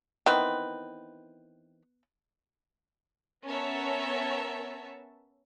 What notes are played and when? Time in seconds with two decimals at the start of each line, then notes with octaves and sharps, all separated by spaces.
0.26 D#3 E3 B3 C4 B4
3.44 B3 C#4 A#4 C#5 E5 A5